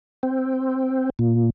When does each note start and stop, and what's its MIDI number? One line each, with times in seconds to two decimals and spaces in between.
0.23 1.10 60
1.19 1.50 46